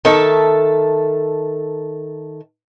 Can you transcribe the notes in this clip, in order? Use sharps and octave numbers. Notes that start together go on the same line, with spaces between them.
D#3 A4 E5 A5